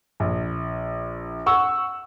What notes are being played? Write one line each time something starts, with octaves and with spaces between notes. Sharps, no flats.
A#1
F#5 C#6 E6